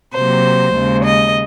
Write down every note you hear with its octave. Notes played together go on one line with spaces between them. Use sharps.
C3 F#3 A#3 C5
D#2 C#3 G#3
D#5